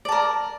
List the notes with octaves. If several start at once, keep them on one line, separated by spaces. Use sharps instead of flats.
A#4 D5 A5